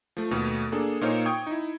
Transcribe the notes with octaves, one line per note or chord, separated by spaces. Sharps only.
F3 A3
D#2 B2 A3 B3
A#3 D4 G#4 A4
A#2 A#3 D#4 C5 C#5 F5
G5 C#6 D#6 G#6
D#4 E4